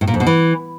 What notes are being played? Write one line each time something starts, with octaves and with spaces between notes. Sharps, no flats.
A2
A#2
F2
B2
E3